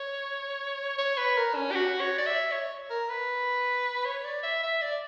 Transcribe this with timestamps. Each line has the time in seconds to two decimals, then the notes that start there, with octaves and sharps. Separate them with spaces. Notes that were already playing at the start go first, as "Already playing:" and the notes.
Already playing: C#5
0.98 C#5
1.18 B4
1.37 A#4
1.55 C#4
1.71 G4
1.75 F#4
2.01 C#5
2.18 D5
2.26 E5
2.52 C#5
2.90 A#4
3.09 B4
4.05 C#5
4.24 D5
4.43 E5
4.63 E5
4.82 D5